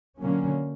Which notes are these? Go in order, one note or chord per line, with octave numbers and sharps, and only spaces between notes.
D3 F#3 A#3 C#4